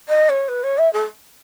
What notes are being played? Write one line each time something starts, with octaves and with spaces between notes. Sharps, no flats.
D#5
C#5
B4
C#5
E5
A4